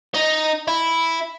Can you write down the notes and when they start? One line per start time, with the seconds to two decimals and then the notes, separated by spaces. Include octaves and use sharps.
0.14 D#4
0.68 E4